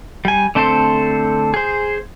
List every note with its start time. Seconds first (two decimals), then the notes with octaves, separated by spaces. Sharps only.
0.25 G3 G#5
0.55 D3 A3 C4 A4 C5
1.54 G#4 C5